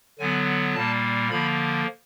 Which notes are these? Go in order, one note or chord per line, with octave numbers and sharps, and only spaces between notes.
D3 F#3 B3 G#5
A#2 G3 A#3 A5
D3 F3 A#3 B5